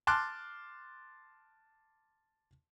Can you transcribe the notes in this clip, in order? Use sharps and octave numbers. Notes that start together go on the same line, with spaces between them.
A5 C6 D6 F6 F#6